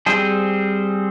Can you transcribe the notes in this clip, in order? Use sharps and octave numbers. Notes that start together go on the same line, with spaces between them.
G3 C4 G#4 C5